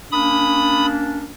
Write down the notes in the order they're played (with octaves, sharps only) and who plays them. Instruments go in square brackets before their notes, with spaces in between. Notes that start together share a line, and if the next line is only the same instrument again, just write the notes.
[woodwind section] A#3 C#4 D4 [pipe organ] B5 D#6